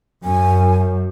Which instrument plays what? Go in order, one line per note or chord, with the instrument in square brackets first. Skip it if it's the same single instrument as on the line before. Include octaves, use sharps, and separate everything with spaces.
[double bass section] F#2 [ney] G#5